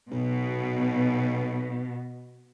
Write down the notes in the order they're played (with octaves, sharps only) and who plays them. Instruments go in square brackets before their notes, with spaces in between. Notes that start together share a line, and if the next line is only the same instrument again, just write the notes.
[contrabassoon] B1 [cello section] B2